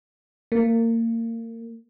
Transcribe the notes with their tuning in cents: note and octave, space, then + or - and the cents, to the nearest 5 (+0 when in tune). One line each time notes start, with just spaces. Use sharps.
A#3 -30